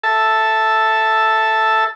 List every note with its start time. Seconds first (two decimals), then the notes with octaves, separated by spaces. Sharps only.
0.03 A4 E5 A5